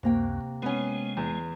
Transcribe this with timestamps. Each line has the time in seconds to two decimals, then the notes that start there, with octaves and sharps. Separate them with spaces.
0.03 C#2 F#2 C3 A#3 G5
0.62 G#3 B3 C#4
1.17 E2